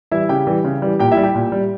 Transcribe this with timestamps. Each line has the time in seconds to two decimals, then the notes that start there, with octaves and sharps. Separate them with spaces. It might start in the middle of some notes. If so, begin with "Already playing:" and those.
0.11 E3 G3 E4 E5
0.29 C#3 G4 G5
0.47 E3 G3
0.64 C#3
0.82 E3 G3
0.99 A#2 G4 G5
1.12 E4 E5
1.17 G3
1.23 G4 G5
1.35 A#2
1.52 G3